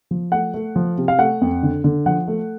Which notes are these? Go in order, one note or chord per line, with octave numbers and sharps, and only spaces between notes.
F3
A3 F#5
A3
F3
C3
F5
A3 F#5
F2
D3
D3
F3 F#5
A3